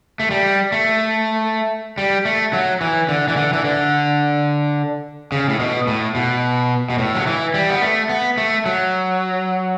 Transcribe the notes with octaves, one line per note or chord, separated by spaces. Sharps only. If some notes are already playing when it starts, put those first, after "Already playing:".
A3
G3
A3
G3
A3
F#3
E3
D3
E3
D3
E3
D3
C#3
A2
B2
A2
B2
B2
A2
F#3
E3
G3
B3
A3
B3
A3
F#3